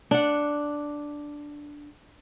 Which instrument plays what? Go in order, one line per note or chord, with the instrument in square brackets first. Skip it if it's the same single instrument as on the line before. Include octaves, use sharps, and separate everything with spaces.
[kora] D4 F#5